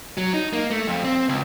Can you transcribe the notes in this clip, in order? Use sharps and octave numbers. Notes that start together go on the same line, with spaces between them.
F#3
D#4
A#3
A3
F2
C4
C#2